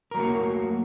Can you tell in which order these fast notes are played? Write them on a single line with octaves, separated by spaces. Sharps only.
A#4 F#3 A3 F#4 A#3